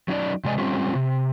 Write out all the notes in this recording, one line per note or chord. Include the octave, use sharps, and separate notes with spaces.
F#3 C#4 D#4 D5
C3 G#3 D5 D#5 G#5
G3 C4 C#4 F4
C3